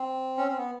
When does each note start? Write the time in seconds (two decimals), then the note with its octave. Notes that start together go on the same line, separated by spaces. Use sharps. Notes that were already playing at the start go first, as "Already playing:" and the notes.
Already playing: C4
0.38 C#4
0.48 C4
0.57 B3